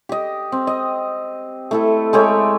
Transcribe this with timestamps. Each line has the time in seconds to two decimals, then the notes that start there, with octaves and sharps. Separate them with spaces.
0.09 G4 D#5
0.52 C4
0.67 D#5
1.71 A3 E4 A4
2.13 G#3 A3 G4 C#5